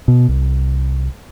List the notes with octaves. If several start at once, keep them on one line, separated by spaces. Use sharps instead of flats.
B2
C2